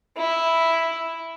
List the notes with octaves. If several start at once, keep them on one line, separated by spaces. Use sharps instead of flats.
E4